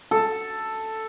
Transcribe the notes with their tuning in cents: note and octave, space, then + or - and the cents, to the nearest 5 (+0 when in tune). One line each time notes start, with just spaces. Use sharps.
A4 +5